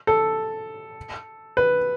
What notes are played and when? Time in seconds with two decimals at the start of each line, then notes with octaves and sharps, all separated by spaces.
0.07 A4
1.57 B4